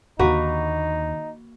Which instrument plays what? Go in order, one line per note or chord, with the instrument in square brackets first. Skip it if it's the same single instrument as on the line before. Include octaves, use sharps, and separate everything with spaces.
[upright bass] D#2 D3 [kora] A#3 F#4 B4 [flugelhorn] D#4